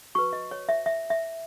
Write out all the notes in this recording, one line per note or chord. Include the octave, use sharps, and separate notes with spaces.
F#4 B4 C#6
D#5
C#5
E5
E5
E5